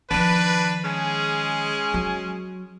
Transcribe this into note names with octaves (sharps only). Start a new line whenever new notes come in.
D#3 F3 D4 B4
G#3 C#4 G#4
F#3